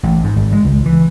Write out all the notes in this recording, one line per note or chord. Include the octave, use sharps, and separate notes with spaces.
A1
G#2
G#1
G#3
C#2
E3